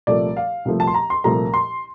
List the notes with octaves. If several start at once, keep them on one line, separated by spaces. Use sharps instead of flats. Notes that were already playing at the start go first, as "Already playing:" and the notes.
C2 A#2 F3 A3 D5
F5
C2 A#2 F3 A3
A5
C6
A#5
C6
C2 A#2 F3 A3 A#5
C6